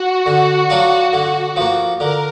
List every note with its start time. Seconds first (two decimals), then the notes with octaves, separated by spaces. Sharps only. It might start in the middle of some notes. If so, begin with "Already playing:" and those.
Already playing: F#4
0.26 D3
0.70 F#3 D4 F4
1.13 D3
1.56 F3 A#3
2.00 D3 A#4